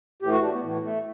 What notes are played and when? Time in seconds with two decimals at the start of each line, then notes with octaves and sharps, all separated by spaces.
0.22 A2 E3 G4
0.32 F#4
0.42 D4
0.53 B3
0.63 A2 E3
0.84 A3